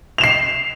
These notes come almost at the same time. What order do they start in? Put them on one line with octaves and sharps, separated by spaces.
F7 E7 C7